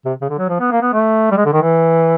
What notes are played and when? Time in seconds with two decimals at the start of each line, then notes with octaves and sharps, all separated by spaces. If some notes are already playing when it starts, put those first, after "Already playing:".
0.05 C3
0.21 C#3
0.29 D3
0.38 F#3
0.49 F3
0.60 B3
0.72 A#3
0.82 B3
0.93 A3
1.31 G3
1.37 G#3
1.45 D3
1.53 D#3
1.62 E3